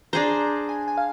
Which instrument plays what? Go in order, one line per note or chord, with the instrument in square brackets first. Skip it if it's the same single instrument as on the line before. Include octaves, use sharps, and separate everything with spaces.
[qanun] D4 G#4 C5 [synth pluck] A#5
[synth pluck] G#5
G#5
F5